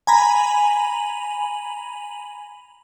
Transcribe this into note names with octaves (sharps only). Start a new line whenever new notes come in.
G#5 A#5 B5